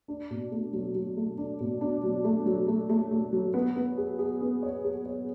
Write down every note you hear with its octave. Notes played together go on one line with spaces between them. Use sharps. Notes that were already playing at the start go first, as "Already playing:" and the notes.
D4
B2
A3
F#3
F#3
A3
D4
B2
D4
F#3
A3
F#3
A3
A3
A3
F#3
B3
B3
G#4
G#4
B3
C#5
G#4
C#5